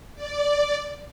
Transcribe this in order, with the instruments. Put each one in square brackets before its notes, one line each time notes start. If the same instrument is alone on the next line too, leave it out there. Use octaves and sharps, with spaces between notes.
[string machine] D5